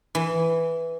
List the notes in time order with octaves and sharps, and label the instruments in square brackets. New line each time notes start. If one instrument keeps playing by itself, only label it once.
[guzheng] E3